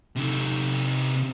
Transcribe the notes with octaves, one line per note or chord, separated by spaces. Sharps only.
C3 D#4